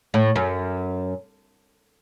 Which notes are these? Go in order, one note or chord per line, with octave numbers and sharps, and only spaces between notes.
A2
F#2